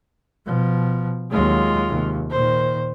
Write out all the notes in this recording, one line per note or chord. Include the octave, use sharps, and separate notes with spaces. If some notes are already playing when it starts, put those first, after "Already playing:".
B2 F3
D#2 F#3 G#3 F4
D#2 C3
A#2 D#3 C5